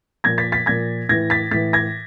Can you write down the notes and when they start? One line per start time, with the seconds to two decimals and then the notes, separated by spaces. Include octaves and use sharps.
0.24 A#2 F3 G#6 A#6
0.38 A6 B6
0.52 A6 B6
0.66 A#2 F3 G#6 A#6
1.09 A2 E3 G#6 A#6
1.30 A6 B6
1.51 A2 E3 A6 B6
1.73 G#6 A#6